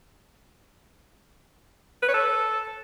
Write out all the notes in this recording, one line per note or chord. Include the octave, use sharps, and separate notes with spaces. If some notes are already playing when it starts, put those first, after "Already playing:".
B4
C#5
A4